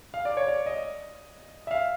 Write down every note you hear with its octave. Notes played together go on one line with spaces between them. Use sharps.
F5
D5
C#5
D5
D#5
E5
F5